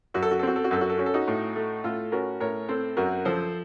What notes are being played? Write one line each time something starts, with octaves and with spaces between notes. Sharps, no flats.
F#2 F#4
A4
F#4
A4
C4 F#4
A4
F#4
F#2 A4
F#4
A4
C#4 F#4
A4
D#4 F#4
A2
A3
A2 F4 A4
C#4 F#4 A#4
A2 A#4 C#5
C4 A4 C5
F#2 F#4 A#4
F3 A4 C5